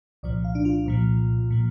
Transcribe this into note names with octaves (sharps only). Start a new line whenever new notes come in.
C2 A#2 F3 D5
F5
D4
F4
C2 A#2 F3
A#2 F3